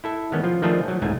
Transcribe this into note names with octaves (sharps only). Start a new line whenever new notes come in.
E4 A4 E5
D#3 E3 G#3 B3 C#4
F3 F4
D#3 F3 A3 D4 F4 G#4
F#3
C2 G#2 A3 G#5